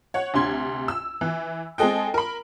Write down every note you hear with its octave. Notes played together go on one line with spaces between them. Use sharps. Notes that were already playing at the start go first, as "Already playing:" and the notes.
C#5 F#5
D2 C3 C6 G#6
E6
E3
G#3 C4 G#4 A4 D#5 G5
A#4 B5